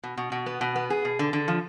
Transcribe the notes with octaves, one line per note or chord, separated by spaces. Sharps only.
B2
B2
B2
B3
B2
B3
G#4
B2
D3
D3
F3